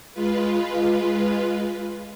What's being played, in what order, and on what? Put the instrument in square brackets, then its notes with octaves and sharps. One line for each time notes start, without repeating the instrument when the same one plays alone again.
[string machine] G#3 F4 B4